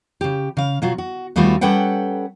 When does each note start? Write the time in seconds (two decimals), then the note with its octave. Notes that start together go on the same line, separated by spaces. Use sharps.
0.21 C#3 G4
0.57 C#3 F5
0.82 B2 F#3 F4 F#4
0.98 F#4
1.36 D#2 G3 A3 B3 F4 F#4
1.61 G3 C#4 A4 B4 F#5 G5